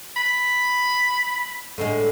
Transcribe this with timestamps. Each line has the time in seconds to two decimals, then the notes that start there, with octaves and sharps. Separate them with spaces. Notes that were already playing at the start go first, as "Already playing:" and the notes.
0.17 B5
1.78 A2 D3 G#3